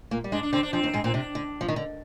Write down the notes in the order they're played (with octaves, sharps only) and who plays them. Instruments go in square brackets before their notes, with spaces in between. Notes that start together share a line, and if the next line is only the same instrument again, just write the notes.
[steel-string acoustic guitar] A#2 A#3
G3
[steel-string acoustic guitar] G#2 G#3 [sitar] D4
[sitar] D4
[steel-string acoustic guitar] D3 [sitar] C4
[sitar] D4
[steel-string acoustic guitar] F2 F3 [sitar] C4
[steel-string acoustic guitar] D#2 D#3
G#2 G#3
[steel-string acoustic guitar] A#2 A#3 [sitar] C4
[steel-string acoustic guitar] C3 [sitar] D4
[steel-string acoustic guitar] D3
F3
D#3
D3